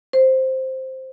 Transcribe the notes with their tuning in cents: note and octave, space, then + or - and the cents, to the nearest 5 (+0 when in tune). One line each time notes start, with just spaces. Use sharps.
C5 +5